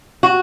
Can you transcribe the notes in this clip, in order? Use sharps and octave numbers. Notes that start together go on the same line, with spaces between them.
F#4